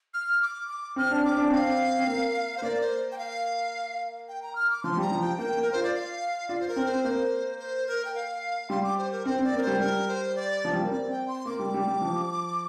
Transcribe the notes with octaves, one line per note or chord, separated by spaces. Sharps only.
F6
D6
D6
C4 F6
D4
C4 D6
D4
C4 F5
C4
A#3
C5
A#3 D5
C5
G5
F5
G5
A#5
F6
D6
F3 C6
G3 A#5
F3
G5
A#3 G5
A#3 A#4
F4 C5
D5
F5
F4 D5
C5
A#4
C4
C5
A#3 C5
C5
A#4
G5
F5
G3 C6
D6
C5
A#4
C4 C5
C4 D5
A#3 A#4
C5
G3
G3 A#4
C5
D5
F3
G3
A#3
C4 D5
G5
C6
A#3 D6
G3
G3
G3
F3